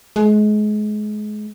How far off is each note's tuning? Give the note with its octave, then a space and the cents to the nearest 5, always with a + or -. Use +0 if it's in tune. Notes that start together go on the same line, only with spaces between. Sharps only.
G#3 +30